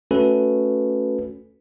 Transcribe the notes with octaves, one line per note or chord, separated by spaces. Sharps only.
A3 C#4 F#4 A4 B4